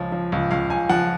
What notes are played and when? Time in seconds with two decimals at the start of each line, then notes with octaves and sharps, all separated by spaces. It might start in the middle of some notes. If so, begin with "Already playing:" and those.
Already playing: C#2 F3 C#5
0.12 F3
0.32 C#2
0.51 C#2 F5
0.70 C#2 G#5
0.90 F3 F#5